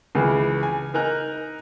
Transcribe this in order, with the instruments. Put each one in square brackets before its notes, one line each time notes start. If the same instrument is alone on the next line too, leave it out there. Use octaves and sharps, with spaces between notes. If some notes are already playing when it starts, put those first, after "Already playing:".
[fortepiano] C#2 E3 G#4
G#5
D#4 A#4 G#5 A#5 F#6